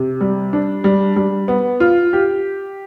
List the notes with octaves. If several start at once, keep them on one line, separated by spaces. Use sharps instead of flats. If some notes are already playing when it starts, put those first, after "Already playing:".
Already playing: C3
G3
D4
G3
G3
B3
F4
G4